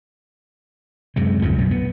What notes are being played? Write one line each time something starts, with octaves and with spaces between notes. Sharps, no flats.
F#2 C3 G#3
D2 G#2 C3 F3
B1 F#2 B2
B3